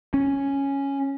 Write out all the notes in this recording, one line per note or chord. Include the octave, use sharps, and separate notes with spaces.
C#4